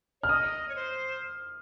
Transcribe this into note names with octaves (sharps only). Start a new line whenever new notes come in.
C#5 F6
D#5 D#6
C#5
C5